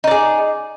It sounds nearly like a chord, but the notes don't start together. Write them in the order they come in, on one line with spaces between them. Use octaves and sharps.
D#4 D5 G#4